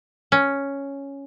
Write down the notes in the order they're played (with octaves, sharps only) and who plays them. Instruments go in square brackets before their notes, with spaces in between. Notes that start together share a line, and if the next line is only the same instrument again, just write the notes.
[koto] C#4